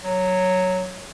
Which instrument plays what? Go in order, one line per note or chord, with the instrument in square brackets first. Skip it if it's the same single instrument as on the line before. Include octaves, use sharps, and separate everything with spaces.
[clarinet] F#3